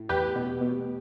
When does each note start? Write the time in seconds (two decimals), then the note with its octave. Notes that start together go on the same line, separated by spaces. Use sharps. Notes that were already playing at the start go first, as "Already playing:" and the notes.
Already playing: A2
0.09 E2 G4 B4
0.35 B2
0.61 B2